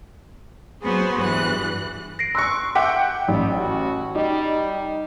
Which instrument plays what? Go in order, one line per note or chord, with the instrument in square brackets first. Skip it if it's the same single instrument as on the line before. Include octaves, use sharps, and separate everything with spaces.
[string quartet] F#3 B3 F#4 G#4 B4 C5
G2 E3 F#6
[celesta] A#6 C7 D7
[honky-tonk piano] C6 C#6 [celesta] E6 F#6 C#7
[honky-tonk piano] E5 F#5 G5 [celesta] D6 B6
[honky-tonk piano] A1 [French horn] G3
[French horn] F#4
[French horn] G3 [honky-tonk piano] D#4